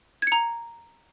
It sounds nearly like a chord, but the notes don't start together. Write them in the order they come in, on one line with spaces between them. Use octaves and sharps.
G#6 C#7 A#5